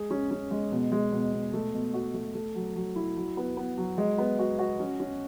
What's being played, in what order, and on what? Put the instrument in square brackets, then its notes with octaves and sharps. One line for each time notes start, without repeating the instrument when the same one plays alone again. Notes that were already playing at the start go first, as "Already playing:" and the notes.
Already playing: [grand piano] G#3 G#4
C#4
C#4
G#3
B2
G#3
B2
B2
A3
B2
F#4
A3
A3
F#3
F#3
E4
F#3
B3
B3
F#3
G#3
B3
F#4
F#4
C#4
C#4